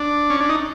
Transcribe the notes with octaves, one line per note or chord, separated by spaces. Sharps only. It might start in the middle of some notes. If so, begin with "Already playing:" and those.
Already playing: D4
C#4
D4
D#4